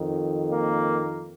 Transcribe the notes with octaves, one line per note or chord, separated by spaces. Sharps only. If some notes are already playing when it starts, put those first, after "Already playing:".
Already playing: F2 D#3
A#3